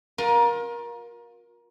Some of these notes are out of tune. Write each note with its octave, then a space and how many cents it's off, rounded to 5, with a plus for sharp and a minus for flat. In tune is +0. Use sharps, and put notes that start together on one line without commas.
F4 +30 A#4 +25